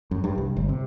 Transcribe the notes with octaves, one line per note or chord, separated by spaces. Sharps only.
F#2
G2
C2
G1
C3